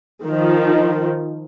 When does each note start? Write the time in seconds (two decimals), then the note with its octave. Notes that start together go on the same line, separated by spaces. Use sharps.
0.25 D#3 F3